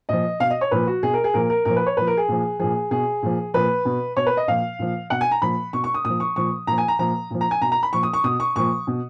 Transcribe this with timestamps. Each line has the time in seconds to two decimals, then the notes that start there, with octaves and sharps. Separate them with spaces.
0.09 A#2 F3 D#5
0.40 B2 F5
0.50 D#5
0.61 C#5
0.71 A#2 F3 B4
0.87 F#4
1.03 B2 G#4
1.14 A#4
1.24 G#4
1.34 A#2 F3 A#4
1.50 A#4
1.65 A#2 F3 A#4
1.76 B4
1.86 C#5
1.97 A#2 F3 B4
2.07 A#4
2.17 G#4
2.28 A#2 F3
2.59 A#2 F3 G#4
2.91 B2 G#4
3.23 A#2 F3
3.54 A#2 F3 B4
3.85 B2
4.17 B2 C#5
4.26 B4
4.37 D#5
4.48 A#2 F3 F5
4.79 A#2 F3
5.10 B2 F#5
5.21 G#5
5.32 A#5
5.42 A#2 F3 B5
5.73 B2 C#6
5.84 C#6
5.94 D#6
6.05 A#2 F3 D#6
6.20 C#6
6.36 A#2 F3 C#6
6.67 A#2 F3 A#5
6.78 G#5
6.88 A#5
6.99 A#2 F3 A#5
7.30 A#2 F3
7.41 A#5
7.51 G#5
7.62 B2 A#5
7.72 A#5
7.83 B5
7.93 A#2 F3 C#6
8.03 D#6
8.13 C#6
8.24 B2 D#6
8.40 C#6
8.56 A#2 F3 C#6
8.87 B2